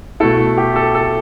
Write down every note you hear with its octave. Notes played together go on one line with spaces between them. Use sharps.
B2 A3 E4 A4
G4
A4
A4